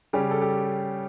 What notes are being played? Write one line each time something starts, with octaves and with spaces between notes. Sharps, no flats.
C#3 G3 C#4 G4
A4
G4